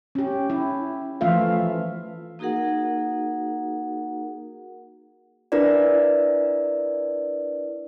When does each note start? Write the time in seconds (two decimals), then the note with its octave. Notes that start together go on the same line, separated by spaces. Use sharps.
0.15 C#4 G4
0.50 E4
1.21 E3 F3 A3 F4 E5 F5
2.39 A#3 D#4 F#4 G#4 A#4 F#5
5.52 D4 E4 A#4 B4 D5